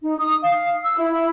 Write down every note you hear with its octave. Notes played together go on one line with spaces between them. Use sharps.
D#4
D#6
F5
E6
E4